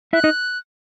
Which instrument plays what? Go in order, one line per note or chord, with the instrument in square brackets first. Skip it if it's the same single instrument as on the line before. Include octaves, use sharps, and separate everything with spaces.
[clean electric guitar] E4 E5 [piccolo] F#6
[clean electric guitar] D#4 D#5